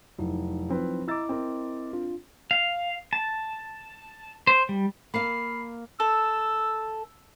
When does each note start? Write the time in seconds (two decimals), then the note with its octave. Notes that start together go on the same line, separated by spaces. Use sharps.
0.19 F1 F#3 D#4 E4
0.69 F3 C4 B4
1.08 E4 D#5 A#5 D6 E6 A6
1.29 C4 A#4
1.93 D4 F4
2.51 F5
3.13 A5
4.47 C5
4.69 G3
5.14 A#3 F5 B5 C7
6.00 A4 E6